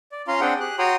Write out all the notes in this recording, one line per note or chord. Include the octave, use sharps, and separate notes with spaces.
D5
C#4 F4 F5 A#5 C6
C4 D4 G#4 F#5 G5
G4 G#4 F#6
F#4 C#5 G5 A#5 C6 D#6